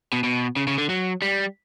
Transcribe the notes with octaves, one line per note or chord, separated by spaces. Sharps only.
B2
B2
C#3
C#3
D3
F#3
G3